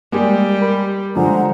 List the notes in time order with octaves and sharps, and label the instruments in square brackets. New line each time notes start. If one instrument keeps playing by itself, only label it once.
[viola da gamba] G3 [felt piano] G#3 A#3 G4
[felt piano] A#4 B5
[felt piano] D3 F3 G#3 [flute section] C5 F#5 A#5